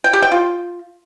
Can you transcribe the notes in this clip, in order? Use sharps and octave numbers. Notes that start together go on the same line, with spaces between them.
G5
G4
G5
F4